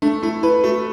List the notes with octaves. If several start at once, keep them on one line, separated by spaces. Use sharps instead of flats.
A3 D4
A3 E4
E4 B4
A3 F#4